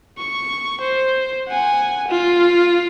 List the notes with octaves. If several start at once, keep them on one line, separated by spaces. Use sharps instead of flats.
C#6
C5
F#5 G#5
F4